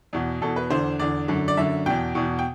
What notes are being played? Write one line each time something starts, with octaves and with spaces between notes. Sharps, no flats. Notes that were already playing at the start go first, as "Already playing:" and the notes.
E2 B2
E2 B2 A4
B4
E2 D3 C5
E2 D3 D5
F#2 D3
D5
F#2 D3 E5
E2 B2 G5
E2 B2
G5